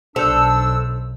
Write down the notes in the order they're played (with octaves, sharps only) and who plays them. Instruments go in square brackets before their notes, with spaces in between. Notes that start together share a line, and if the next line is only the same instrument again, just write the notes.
[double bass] B1 [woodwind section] D4 E6 [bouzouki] A4 [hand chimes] C5 G6